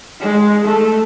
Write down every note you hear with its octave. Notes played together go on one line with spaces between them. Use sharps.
G#3
A3